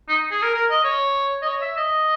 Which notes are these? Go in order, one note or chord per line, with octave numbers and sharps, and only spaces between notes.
D#4
G#4
A#4
A#4
D#5
C#5
D#5
C#5
E5
D#5